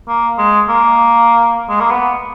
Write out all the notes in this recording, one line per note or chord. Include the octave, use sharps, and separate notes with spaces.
A#3
G#3
A#3
G#3
A#3
B3